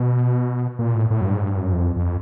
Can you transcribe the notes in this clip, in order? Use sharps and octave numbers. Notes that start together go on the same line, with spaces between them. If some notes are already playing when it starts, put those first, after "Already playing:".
Already playing: B2
A#2
A2
A2
F#2
G2
G#2
G2
F#2
F2
F2